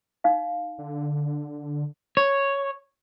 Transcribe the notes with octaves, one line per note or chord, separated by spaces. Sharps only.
D#4 F5
D3
C#5